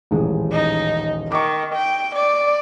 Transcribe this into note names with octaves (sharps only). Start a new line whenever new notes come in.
D#1 A1 G#3
D#4
D#3 C#6 D6
G5
D5